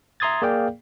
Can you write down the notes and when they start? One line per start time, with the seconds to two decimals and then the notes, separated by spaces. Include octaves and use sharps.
0.20 E5 A#5 C6 D#6 G#6 A6
0.42 A#3 G#4 D5 F5 G5